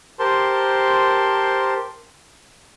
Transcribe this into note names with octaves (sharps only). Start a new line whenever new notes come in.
G4 A#4 C5 A5 C6